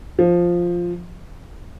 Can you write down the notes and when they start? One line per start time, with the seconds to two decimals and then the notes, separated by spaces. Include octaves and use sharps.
0.19 F3